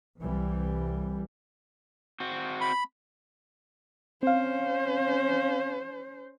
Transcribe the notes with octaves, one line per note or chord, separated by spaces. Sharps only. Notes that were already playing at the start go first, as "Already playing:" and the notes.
C2 E3 G3
C4 F#4
B5
C4 C#4 C5 F5